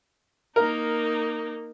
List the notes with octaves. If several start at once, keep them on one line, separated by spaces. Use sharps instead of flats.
A#3 D#4 A#4